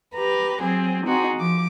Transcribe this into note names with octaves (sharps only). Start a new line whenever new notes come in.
G4 B4 A#5
F#3 C4 G#4
C4 D#4 F#4 G#4
F3 D6